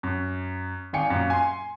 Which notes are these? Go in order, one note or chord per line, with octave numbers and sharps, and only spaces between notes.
F#2
G#1 D5 F5 G5 G#5 C#7
F#2 A#2
G#5 C6